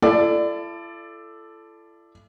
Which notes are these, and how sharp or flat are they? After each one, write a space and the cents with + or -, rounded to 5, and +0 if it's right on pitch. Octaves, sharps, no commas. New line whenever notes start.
E4 +45 A4 +0 D5 +10